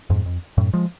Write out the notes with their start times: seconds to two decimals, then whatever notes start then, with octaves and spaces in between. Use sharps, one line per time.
0.10 F2 G#2
0.26 F2
0.58 F#2 A2
0.73 F3 G#3